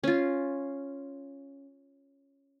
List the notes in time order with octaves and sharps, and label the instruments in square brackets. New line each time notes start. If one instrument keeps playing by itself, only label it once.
[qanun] C#4 F4